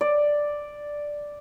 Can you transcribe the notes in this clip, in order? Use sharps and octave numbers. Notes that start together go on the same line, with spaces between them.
D5